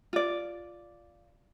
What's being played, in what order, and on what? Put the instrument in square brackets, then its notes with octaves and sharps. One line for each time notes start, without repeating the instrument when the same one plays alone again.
[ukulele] F4 D5